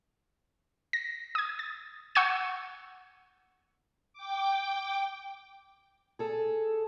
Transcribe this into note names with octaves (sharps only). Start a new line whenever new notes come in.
A#6
D#6 G#6
A6
F#5 C#6 E6 G6 G#6 D#7
G5 D6
G#4 A4